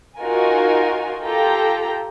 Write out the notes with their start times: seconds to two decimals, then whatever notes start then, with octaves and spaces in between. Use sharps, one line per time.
0.20 D#4 F4 F#4 A#4 G#5
1.25 F4 G4 A4 G5 A#5